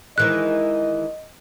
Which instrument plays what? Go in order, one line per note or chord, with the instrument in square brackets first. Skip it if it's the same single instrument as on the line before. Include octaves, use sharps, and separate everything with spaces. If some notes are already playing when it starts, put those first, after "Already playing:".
[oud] D#3 E3 G#3 [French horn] D#5 [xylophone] F#6